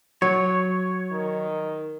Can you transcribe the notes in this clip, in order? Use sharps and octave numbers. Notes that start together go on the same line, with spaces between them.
F#3 C#5
D#3